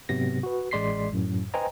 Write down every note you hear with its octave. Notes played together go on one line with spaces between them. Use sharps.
G#2 C3 F#3 B3 A#6
F#4 B4
A1 G#3 D5 C6 B6 C7
F#2 A2 F#3
B4 C5 D#5 G5 G#5 A#5